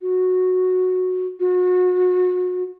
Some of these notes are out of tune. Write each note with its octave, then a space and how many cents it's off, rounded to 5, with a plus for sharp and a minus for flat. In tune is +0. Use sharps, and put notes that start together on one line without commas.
F#4 -10
F#4 -30